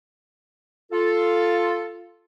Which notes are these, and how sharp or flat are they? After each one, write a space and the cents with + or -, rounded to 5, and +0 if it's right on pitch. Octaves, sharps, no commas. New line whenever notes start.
F4 +0 A4 +0